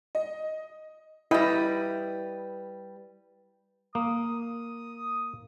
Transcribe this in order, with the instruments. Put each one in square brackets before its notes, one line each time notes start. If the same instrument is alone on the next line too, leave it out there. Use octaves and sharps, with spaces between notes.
[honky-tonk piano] D#5
[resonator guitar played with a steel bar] G3 B4 [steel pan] E4 D#5 G5
[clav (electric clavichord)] A#3 [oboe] D#6